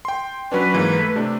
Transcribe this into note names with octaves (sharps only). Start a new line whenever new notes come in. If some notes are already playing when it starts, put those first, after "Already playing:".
G5 C6
F#3 C#4 D4 B4
G#2 E3 A#3
A3
C3 A3 D4